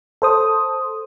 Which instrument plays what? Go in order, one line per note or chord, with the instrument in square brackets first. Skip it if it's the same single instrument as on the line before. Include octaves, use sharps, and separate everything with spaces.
[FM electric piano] A4 C5 D#6